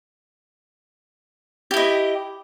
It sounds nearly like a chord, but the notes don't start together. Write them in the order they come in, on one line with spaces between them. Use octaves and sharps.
G4 E4 D#5